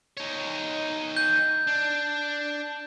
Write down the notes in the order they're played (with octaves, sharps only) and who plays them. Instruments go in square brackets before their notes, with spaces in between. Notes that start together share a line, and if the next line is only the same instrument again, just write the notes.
[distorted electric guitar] D#4 C#5
[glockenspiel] G6
[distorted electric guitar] D4